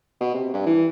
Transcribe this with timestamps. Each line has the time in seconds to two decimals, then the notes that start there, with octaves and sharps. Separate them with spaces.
0.21 B2
0.34 C3
0.54 G2
0.66 E3